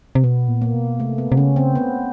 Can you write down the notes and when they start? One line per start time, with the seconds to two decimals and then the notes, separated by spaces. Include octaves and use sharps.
0.15 C3
0.24 B2 B3
0.48 A#2
0.62 A#3
0.74 B2
1.00 C3 A3
1.18 B3
1.32 C3
1.37 C#3 C#4
1.56 C4
1.75 B3